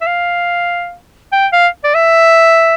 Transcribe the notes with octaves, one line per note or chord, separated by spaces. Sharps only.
E5
F5
G5
F5
D5
E5